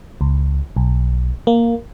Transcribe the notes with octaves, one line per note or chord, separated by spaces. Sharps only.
C#2
B1
A#3